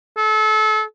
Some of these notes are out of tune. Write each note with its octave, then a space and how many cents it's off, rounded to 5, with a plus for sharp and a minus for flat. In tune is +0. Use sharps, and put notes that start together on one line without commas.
A4 -30